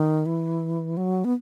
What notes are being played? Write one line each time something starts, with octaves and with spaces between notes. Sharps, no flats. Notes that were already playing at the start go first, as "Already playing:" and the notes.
Already playing: D#3
E3
F#3
B3